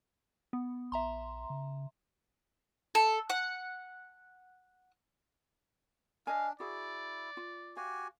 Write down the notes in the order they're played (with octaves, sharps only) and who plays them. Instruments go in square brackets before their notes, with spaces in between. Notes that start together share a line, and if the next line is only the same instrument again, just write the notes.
[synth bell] B3
[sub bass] A#1 [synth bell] E5 A#5 C6
[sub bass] C#3
[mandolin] A4
F#5
[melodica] D4 [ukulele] D#5 G#5 [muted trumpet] F5
[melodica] E4 [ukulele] F#4 G#4 [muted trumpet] D5
[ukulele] F4
[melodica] F#4 G4 G#5 [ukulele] F5